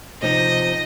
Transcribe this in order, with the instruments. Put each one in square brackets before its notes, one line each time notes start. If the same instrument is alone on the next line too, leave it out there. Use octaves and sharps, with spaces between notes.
[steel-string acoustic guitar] C3 F3 C4 D#4 [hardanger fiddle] D#5